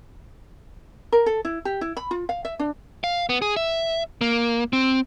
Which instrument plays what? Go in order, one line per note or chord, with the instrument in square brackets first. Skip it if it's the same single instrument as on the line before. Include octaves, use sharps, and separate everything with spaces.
[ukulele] A#4
A4
E4
G4
E4
B5
F4
F5
E5
D4
[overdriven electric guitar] F5
B3
G#4
E5
A#3
C4